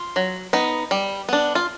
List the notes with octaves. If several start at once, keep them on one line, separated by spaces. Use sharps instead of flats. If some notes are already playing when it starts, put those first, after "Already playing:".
Already playing: F4
F#3
B3 D#4
G3
B3 D4
F4